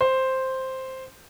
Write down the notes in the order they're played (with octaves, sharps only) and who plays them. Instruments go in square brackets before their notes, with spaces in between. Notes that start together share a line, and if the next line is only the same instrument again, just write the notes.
[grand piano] C5